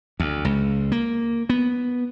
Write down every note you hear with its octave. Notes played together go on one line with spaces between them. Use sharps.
D2
C#2
A#3
B3